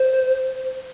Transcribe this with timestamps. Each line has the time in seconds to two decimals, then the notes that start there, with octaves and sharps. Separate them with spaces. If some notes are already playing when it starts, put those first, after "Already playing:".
Already playing: C5